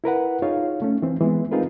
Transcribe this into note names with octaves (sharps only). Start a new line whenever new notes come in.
E4 A#4 B4 F#5
D#4 F4 G#4 C#5 F5
A3 C#4
E3 C4
E3 G#3 B3
C4 D#4 F4 G#4 A#4 B4